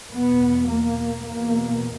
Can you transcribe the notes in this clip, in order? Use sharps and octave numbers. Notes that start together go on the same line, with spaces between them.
E2 B2 B3
A#3
E2 B2 A#3